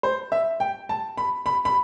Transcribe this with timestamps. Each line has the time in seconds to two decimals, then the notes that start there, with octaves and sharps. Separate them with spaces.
0.03 C5
0.32 E5
0.60 G5
0.89 A5
1.17 B5
1.46 B5
1.65 B5